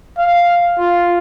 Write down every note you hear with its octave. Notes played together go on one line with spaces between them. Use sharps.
F5
F4